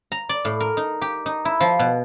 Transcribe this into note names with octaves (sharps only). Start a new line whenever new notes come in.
A#5
D5
A2
A#4
D#4
G4
D#4
E4
F3
B2